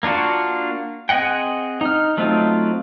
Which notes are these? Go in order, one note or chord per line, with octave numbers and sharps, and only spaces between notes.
A#3 D4 F4 F#4
C4 G#4 D#5 F#5 G5
D#4 F6
F#3 A3 C4 D#4 F4